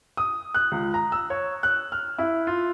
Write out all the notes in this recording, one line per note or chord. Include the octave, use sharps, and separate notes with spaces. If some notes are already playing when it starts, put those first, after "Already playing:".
D#6
F#6
C#2
A#5
E6
C#5
F#6
F6
E4
F4